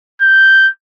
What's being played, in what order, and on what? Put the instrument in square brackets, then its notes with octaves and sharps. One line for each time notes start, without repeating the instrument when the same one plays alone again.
[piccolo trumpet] G6